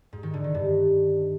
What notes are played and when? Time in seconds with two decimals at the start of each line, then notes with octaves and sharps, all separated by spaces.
0.13 G#2
0.23 D#3
0.34 D3
0.44 D#3
0.55 G2